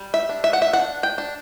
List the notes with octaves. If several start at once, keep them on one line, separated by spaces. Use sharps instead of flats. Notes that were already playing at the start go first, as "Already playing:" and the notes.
Already playing: G3
E5
D4
E5
F#5
E5
D4 F#5
G5
D4